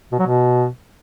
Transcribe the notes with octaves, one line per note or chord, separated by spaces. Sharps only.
B2
F#3
B2